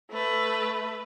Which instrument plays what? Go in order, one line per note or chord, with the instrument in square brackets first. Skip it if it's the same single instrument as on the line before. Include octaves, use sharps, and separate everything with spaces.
[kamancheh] A3 B4